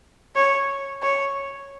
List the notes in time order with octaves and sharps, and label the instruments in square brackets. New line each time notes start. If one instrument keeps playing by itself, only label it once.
[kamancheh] C#5
C#5